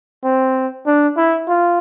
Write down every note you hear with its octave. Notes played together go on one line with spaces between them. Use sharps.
C4
D4
E4
F4